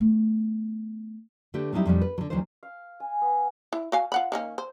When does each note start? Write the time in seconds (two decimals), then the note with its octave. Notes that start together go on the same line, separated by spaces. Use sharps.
0.01 A3 B3
1.54 D3 A3 G4 B4
1.73 F#3 G3 C4 D#4 E4 G4
1.85 F2 B2 G3 B3 C#4 D#4
2.01 B4
2.18 D3 F#3
2.30 D2 E3 F#3 C#4 D#4 C5
2.63 F5
3.00 G#5
3.22 B3
3.73 E4
3.92 F#4 F5 G#5
4.12 F4 F#5 B5
4.32 D#3 A#3 C#4
4.58 C5